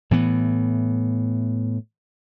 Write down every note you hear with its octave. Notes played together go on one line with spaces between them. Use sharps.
A2 E3 B3